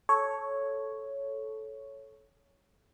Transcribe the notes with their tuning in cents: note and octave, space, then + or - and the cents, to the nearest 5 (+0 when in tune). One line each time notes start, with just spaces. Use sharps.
A4 -10 C#5 +0